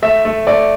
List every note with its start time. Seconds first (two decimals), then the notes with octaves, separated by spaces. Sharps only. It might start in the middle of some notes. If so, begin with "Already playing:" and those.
0.02 A3 E5
0.25 A3
0.47 A3 D5